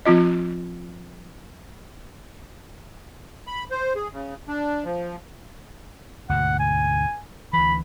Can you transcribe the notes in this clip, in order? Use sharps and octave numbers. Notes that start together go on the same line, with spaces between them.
F3 C4 F4 D#5
B5
C5
G#4
C#3
D4
F3
D2 G#2 B2 F#5
G#5
D2 E3 B5